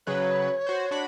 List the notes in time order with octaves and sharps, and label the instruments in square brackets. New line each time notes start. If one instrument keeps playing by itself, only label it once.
[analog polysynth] C#3 F#3 B4 [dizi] C#5
[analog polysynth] F#4 C5
D4 F#4 B5